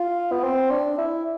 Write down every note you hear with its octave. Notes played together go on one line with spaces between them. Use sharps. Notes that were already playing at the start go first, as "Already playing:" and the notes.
Already playing: F4
B3
C4
D4
E4